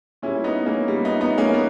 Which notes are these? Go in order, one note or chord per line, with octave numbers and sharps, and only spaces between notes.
A#2 G3 C#4 E4
B3 D#4
A#3 C#4
A#2 G3
B3 D#4
B3 D#4
A#3 C#4
B3